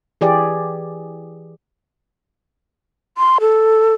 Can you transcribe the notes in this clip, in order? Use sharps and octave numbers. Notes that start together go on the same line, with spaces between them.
E3 G4 G#4 D5
C6
A4